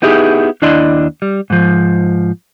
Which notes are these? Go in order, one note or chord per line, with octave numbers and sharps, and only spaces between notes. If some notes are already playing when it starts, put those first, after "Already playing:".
B3 D#4 E4 G4 G#4
D#2 D4 E4 D5 D#5 C6
G3
G#2 F3